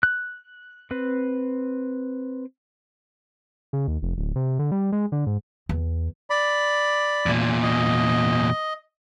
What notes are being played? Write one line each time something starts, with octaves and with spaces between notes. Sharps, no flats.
F#6
C4 B4
C#3
D#2
F1
D1
C3
D3
G3
G#3
D3
G#2
E2
D5 B5
E2 A#2
D#5